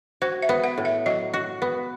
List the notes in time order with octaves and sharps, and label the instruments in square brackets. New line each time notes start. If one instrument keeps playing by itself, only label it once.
[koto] F#4 [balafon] C5
[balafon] E5
[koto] B3
[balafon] F#5
[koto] A2
[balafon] E5
[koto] F#3 [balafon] D#5
[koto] F#4
B3